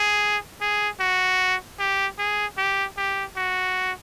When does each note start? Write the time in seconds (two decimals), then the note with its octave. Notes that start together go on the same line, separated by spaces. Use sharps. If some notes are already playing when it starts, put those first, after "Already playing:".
Already playing: G#4
0.61 G#4
1.00 F#4
1.79 G4
2.18 G#4
2.58 G4
2.97 G4
3.37 F#4